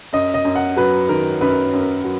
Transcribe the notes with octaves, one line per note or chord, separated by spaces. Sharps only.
F#2 D#5
D#5
F#2
F#5
F#3 B4
D#3 A#4
F#2 B4
F#2
F#3